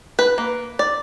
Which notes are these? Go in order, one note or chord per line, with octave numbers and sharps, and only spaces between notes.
B4
A#3
D5